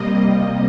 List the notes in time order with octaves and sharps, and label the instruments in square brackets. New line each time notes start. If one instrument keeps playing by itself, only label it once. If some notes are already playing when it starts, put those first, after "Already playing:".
Already playing: [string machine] C3 G3 A#3 D#5